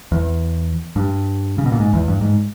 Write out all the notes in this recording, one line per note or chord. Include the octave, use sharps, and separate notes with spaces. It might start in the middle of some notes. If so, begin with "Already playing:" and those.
E2
G2
C#3
B2
A#2
G#2
E2
G2
G#2